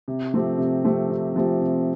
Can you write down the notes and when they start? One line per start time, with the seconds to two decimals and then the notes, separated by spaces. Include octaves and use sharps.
0.08 C3
0.34 F3 A3 C4 G4
0.58 C3
0.85 F3 A3 C4 G4
1.10 C3
1.36 F3 A3 C4 G4
1.61 C3